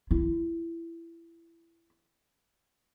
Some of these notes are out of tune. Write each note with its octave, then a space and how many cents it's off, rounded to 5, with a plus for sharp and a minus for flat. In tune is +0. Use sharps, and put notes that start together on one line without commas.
E4 +20